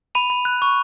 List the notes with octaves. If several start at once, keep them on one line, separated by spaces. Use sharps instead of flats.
B5 D#7 F7
B5
F#6
C#6